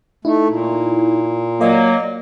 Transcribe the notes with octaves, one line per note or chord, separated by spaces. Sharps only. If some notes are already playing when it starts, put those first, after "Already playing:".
A3 D#4 E4
A#2
F#3 A#3 A#4 D5 D#5